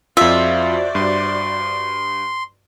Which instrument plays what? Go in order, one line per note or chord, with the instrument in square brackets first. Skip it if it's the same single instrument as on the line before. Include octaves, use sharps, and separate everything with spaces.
[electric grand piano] F2 F4 [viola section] F#4 C5 D5 [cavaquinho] E5
[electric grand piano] G2 [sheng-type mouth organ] C6